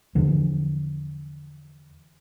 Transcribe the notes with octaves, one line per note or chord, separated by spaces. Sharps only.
E2 D3 E3 F3